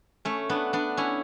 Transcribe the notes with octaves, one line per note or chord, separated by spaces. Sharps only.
A3 C#4
B3 D4
B3 D4
C#4 E4